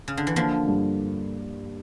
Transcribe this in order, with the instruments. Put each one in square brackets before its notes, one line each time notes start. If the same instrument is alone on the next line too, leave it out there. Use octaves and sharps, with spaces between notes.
[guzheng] C#3
D3
E3
[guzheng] D3 F3 [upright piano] A#3
[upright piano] G2